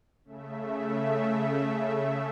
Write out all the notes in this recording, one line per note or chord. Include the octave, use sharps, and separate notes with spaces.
C#3 A3 E5